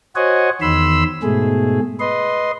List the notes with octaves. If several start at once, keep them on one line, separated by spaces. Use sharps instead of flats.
F#4 C5 C#5 D#5 F#5 G#5
E2 D#3 B5 C6 E6
G#2 B2 A3 G#4
B4 D#5 C6